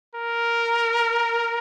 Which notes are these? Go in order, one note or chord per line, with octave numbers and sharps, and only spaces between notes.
A#4